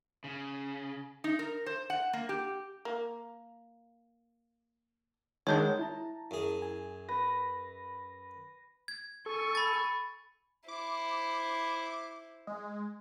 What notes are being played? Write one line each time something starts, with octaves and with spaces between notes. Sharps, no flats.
C#3
D#4
A#4
C5
F#5
A#3
G4
A#3
D#3 F#3 G#3 D4 G#4 C#5 G6
E4 A5 A#5
F#2 G#4
G#5
B4 A#6
G#6
A4 G#5 C#6
B5 A6
E4 C5 D6
G#3